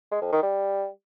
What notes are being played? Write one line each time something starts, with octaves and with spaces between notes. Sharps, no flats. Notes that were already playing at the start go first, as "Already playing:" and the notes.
G#3
F2
D#3
G3